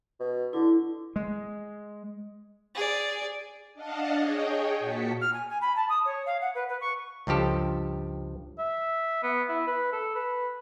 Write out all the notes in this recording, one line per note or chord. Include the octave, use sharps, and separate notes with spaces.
B2
D3 E4
G#3
G#4 D5
D4 D#5 F5 F#5 A5
G#4 C#5 D#5 G5
A#2 F#4 A5 B6 C#7
F6
G#5
G#5
B5
A5
D#6
C#5
F5
F#5
B4
B4
C#6
C#2 G2 F3 G4 A4
E5
B3
E4
B4
A4
B4